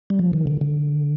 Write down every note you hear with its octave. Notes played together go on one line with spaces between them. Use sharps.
G3
F3
D#3
D3
D3